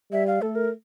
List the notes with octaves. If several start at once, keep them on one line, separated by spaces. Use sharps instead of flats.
G3 E5
F5
A3 A4
A#4